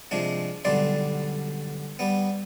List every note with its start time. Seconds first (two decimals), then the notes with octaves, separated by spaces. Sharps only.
0.11 C3 F3 G#3 D4
0.65 B1 G2 D3 G3 D5 C6
1.99 G3 B3